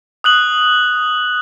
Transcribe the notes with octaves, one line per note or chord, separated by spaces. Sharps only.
D#6 F#6 F#7